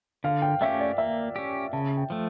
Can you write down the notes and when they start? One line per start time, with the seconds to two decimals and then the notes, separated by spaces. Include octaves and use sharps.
0.24 D3 F5
0.42 G5
0.61 A3 C#4 G4 E5
0.80 D5
0.98 A#3 E5
1.36 C#4 G4
1.73 C#3 A5
1.97 G5
2.10 F3 A3